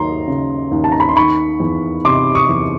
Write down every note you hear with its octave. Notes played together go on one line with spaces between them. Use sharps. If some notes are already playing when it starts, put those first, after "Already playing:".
Already playing: D#2 F#3 A#5 C6
C#3
D#2
A5
A#5
B5
C6
D#3 B5 C#6
E2
C3 C6 D6
C#6 D#6
E2